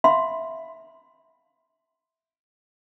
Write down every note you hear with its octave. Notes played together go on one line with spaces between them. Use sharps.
E5 F5 B5 C6